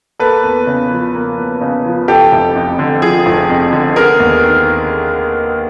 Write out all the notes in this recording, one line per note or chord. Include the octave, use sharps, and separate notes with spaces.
A#3 A4 B4
E2
C#3
F3
A#3
E2
C#3
F3
F3 G4 A4
F1
F2
D3
F3 G#4
F1
F2
D3
B3 G#4 A#4
D#2
D#3